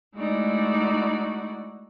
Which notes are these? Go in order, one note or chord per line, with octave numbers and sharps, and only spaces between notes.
G#3 A3 D#4 E4 F#4 D5